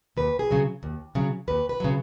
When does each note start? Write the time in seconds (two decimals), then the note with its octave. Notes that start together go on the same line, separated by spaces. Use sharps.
0.17 D#2 B4
0.39 G#4
0.51 C#3 F#3
0.83 D#2
1.15 C#3 F#3
1.48 D#2 B4
1.69 B4
1.80 C#3 F#3